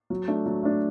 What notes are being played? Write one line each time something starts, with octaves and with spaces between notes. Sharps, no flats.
F#3
A3 D4
F#3
A3 D4